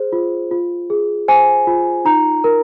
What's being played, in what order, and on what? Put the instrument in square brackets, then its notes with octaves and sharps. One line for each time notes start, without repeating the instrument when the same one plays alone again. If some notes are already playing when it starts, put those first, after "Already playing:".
Already playing: [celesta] G#4 C5
F4
F4
G#4
C5 G#5
F4
D#4 A#5
A#4